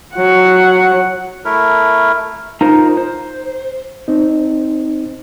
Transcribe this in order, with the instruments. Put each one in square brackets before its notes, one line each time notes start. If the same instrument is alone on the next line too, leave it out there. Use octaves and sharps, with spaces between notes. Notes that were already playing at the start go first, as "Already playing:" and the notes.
[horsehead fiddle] F#3 F#5
[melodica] A3 E4 A#4
[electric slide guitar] D#4 F4 A#4 C5
C5
[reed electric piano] C4 D#4